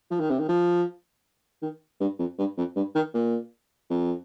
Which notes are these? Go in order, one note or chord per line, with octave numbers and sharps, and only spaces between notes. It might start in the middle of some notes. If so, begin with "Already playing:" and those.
F3
D#3
C3
D#3
F3
D#3
G2
F2
G2
F2
G2
D#3
A#2
F2